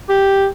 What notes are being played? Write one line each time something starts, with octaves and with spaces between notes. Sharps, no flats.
G4